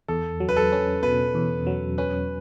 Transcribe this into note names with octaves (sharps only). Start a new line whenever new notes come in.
E2 A4
F#3
B4
A4
C#4
B2 B4
E2
F#3
C#4 B4